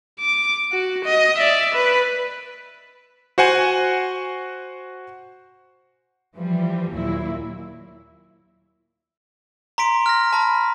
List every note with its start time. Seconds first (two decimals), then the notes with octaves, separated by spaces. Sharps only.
0.20 D6
0.72 F#4
1.04 D#5
1.38 D5 E5
1.74 B4
3.38 F#4 C5 F#5 G#5
6.37 E3 F3 G3
6.93 D#2 A#2 F#3 E4
9.78 A#5 C6 B6 D7
10.06 F6 A#6
10.33 A5 B5